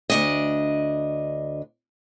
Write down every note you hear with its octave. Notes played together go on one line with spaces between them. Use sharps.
D2 D4 D#5